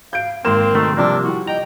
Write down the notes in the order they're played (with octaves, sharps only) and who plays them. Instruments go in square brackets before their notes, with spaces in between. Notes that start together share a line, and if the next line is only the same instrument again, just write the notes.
[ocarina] F5 [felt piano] G6 D7
[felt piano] G#1 C6 E7 [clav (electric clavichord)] A#3 [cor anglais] C4 [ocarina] A#4
[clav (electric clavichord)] B2 D#3 A3
[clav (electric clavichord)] C3 A#3 [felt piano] F3 G3 [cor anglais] D4 [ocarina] D5
[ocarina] E4 [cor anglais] F#4
[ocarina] D#5 [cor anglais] G5 [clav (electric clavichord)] A#5